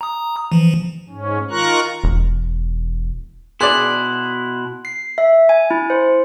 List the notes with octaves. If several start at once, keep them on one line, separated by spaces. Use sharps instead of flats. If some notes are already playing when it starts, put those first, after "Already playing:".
A#5 D#6
E3 F3
G#2 C#4
D#3 F4 A#4 A#5 C#6 F#6
E1
B2 E4 G#4 D5 C6 F#6 F#7
C7
E5
G#5
E4
C5